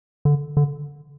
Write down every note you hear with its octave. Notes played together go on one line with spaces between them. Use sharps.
D3
D3